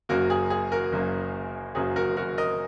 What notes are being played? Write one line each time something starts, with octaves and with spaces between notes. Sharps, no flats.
F#1 F#2 F#3 A#3 F#4 A#4
G#4
G#4
F#4 A#4
F#1 F#2 F#3 A#3
F#1 F#2 F#3 A#3 G#4
F#4 A#4
F#4 A#4
A#4 D#5